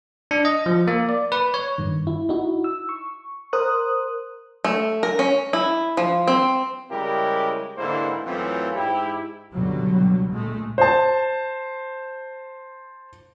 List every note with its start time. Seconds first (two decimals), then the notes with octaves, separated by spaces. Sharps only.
0.31 D4
0.45 D#5
0.66 F3
0.87 A#3
1.09 D5
1.32 B4
1.54 C#5
1.78 G2 D#3
2.07 E4
2.29 D#4 E4 F#4
2.64 E6
2.89 C#6
3.53 A#4 C5 D#6 F#6
4.65 A3
5.03 A#4
5.19 C#4
5.53 E4
5.97 F3
6.28 C4
6.91 C#3 G3 G#3 E4 G4 A#4
7.77 G#2 D3 E3 A#3 E4 C5
8.25 F#2 E3 A3 C4 C#4 F4
8.76 G#2 E4 G4
9.52 C#2 G2 B2 D3 F#3 G3
10.32 A#2 G#3 A3
10.78 C5 A5